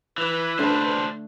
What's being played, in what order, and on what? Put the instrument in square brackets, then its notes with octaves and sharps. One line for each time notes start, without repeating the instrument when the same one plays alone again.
[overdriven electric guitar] E3 [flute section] B4
[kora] D3 A3 [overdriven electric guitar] D4 C5